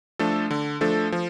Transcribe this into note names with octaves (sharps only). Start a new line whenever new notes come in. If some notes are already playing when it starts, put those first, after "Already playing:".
F3 A3 D4 A4
D3
F3 A3 D4 A4
F3